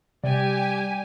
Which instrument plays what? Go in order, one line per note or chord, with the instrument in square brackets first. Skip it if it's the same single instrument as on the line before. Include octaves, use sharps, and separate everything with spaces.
[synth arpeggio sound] C3 [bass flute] G3 [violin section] G4 G#5 [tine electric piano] D5